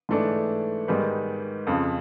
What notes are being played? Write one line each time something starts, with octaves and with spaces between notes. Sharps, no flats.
G#2 E3 A3 D4
G#2 D#3 G3 B3
F2 C#3 F3